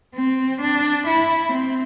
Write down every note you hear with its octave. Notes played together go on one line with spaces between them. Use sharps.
C4
D4
E4
C4